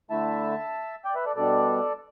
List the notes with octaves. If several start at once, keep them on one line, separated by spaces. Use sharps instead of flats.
D3 A3 E4 E5 A5
D5 G5
B4 E5
A4 D5
B2 G3 D4 A4 D5